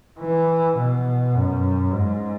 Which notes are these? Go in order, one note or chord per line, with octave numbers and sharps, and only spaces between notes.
E3
B2
F#2
G#2